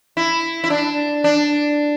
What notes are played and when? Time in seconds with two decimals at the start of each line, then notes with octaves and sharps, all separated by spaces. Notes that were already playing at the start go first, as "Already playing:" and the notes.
0.17 E4
0.64 E4
0.70 D4
1.24 D4